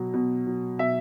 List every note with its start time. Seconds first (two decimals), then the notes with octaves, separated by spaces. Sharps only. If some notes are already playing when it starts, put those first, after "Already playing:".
Already playing: B2 F#3
0.14 B2
0.46 F#3
0.79 B2 E5